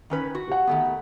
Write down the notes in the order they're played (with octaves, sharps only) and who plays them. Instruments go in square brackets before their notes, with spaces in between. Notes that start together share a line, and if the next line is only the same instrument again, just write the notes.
[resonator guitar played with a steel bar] D#3 C#4 B4
F#4
[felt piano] G4 F#5
[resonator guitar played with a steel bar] D#3 A3 B3